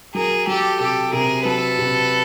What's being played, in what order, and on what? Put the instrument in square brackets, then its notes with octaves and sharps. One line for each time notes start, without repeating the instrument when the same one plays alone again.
[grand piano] F#3 [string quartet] G#4 A#4
[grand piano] F#3 [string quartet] G4 A4
[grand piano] C3 [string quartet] G4 A4
[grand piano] C3 [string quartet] G#4 A#4
[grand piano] F#3 [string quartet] A4 B4
[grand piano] C3